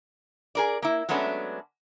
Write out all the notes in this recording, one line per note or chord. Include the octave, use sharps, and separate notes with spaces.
G#4 A#4 D5
A#3 E4
F#3 G#3 A3 B3 C#4 D4